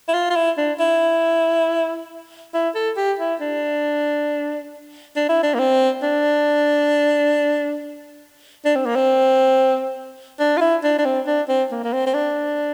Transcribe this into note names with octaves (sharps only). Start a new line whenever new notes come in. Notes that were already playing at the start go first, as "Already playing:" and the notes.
E4
F4
F4
E4
D4
E4
E4
A4
G4
E4
D4
D4
E4
D4
A#3
C4
D4
D4
C4
A#3
C4
D4
F4
E4
D4
D4
C4
D4
C4
A#3
A#3
C4
C4
D4